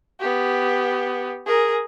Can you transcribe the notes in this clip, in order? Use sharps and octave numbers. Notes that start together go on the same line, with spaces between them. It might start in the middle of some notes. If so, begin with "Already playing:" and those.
B3 G4
G#4 A#4